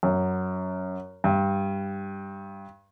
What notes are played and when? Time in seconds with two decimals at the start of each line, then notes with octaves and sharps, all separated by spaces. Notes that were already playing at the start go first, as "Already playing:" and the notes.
0.03 F#2
1.24 G2